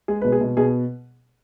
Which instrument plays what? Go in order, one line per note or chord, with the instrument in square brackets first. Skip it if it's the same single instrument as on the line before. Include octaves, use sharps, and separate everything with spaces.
[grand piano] G#3 G#4
B2 B4
G#4
B2
B2 G#4